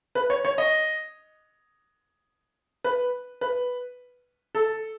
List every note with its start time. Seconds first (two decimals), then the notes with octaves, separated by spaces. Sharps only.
0.15 B4
0.30 C#5
0.45 C#5
0.58 D#5
2.84 B4
3.41 B4
4.55 A4